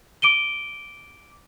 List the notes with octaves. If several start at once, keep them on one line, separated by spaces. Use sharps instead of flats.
D6 D7 D#7 G7